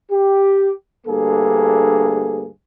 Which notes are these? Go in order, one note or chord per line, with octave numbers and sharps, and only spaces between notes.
G4
D2 G2 A#3 G#4 A4